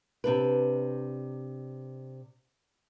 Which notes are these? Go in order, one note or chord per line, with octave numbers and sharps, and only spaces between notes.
C3 D4 B4